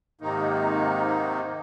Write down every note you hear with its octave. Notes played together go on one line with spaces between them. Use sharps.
G#2 C3 D#3 A#3 D#4